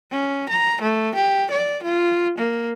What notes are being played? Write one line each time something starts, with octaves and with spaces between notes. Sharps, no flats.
C#4
A#5
A3
G4
D5
F4
A#3